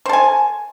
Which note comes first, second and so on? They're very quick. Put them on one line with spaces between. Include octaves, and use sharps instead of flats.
C5 A4 G#5